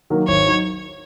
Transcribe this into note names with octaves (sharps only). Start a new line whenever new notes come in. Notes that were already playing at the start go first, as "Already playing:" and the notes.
D#3 F#3 A#3
G#1 C#5
F#3 D#4